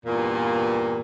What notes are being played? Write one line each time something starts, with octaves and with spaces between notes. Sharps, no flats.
E2 G2 A#2